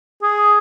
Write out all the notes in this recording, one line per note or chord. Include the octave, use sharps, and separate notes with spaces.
G#4